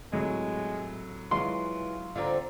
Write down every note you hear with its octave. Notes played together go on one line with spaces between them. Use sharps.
A2 C3 F#3 G#3
E3 F#3 G#3 F4 F#4 C6
D3 C4 F4 D5 A#5